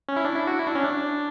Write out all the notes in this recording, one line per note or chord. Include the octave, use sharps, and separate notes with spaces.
C#4
E4
D4
E4
F#4
E4
D4
C#4
D4